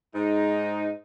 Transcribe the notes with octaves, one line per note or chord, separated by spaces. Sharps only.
G#2 D#4